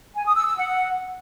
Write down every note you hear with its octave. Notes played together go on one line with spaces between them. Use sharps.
G#5
D#6
E6
E6
F#5